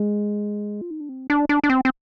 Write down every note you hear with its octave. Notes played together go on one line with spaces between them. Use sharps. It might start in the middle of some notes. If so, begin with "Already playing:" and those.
Already playing: G#3
F4
D#4
D4
C4
D4
D4
D4
C4
C4